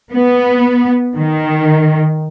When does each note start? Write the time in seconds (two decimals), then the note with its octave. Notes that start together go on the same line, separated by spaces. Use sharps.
0.13 B3
1.16 D#3